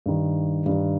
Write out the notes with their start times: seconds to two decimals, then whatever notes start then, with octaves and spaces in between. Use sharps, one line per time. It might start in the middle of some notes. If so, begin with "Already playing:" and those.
0.06 G2 D#3
0.66 G2 D#3